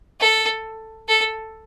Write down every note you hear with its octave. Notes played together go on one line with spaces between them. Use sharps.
A4
A4